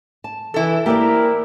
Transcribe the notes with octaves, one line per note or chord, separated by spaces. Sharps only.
A5
E3 E4 A4
A#3 E4 G4 A#4 C5 D5